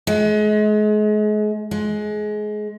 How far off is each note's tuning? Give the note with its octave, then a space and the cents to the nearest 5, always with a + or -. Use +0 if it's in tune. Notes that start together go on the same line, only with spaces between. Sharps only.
G#3 +35
G#3 +25